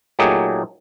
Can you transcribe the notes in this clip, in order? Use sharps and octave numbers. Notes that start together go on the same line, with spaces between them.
A#2 F#3 A3 D#4 G4 G#4